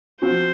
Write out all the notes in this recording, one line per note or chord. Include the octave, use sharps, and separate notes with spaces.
F3 C4 F#4 C5